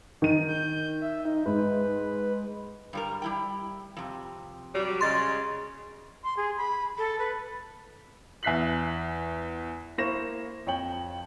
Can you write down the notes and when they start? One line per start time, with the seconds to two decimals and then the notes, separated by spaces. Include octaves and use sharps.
0.22 D#3 D#4 D#7
0.49 G6
1.01 E5
1.25 D#4
1.46 G#2 B4
2.93 G2 G3 A#4
3.22 G3 E4 G5
3.97 F2 C3
4.73 F#3 G3
5.01 C#3 G#3 C6 A6
6.24 C6
6.37 G#4
6.57 B5
6.98 A4
7.19 B4
8.43 E2 E5 F#6 B6 C7 F#7
9.98 A#3 E4 C5 C#6 A#6 E7
10.66 F2 C#5 G5 F#7